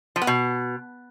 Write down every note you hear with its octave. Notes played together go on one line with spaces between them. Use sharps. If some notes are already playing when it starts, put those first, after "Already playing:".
F3
B3
B2